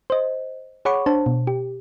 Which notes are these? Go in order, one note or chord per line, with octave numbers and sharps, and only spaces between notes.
C5 D#5
G#4 C#5 F#5 B5 C#6 D6
D4 C5 A5
B2
G4